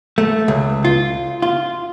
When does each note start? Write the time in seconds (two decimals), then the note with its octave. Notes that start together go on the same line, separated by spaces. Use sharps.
0.18 A3
0.48 C#2
0.85 F4
1.42 F4